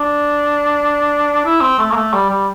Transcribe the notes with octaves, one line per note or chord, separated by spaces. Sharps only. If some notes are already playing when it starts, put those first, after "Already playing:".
Already playing: D4
E4
C4
A3
A#3
A3
G3
G3